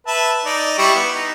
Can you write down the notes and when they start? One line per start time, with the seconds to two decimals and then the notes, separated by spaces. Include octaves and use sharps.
0.07 B4 E5 A5
0.45 D#4 D5
0.78 G3 E4 C#6
0.95 B3
1.14 D#4